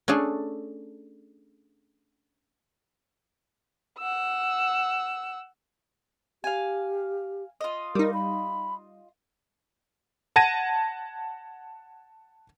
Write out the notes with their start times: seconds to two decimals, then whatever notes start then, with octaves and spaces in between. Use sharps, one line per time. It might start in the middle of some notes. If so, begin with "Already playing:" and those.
0.08 A3 C#4 D4 G#4 A4
3.99 F#5 E6
6.44 G4 F5 G#5
7.61 F4 D#5
7.95 G3 D#4 A#4
8.14 B5
10.36 F#5 A5 G#6 A#6 D#7